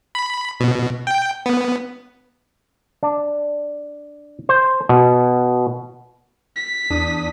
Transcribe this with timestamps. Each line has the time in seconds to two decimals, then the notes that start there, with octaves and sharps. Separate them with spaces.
0.15 B5
0.60 B2
1.07 G5
1.46 B3
3.03 D4
4.49 C5
4.89 B2
6.56 B6
6.90 E2 D4 D#6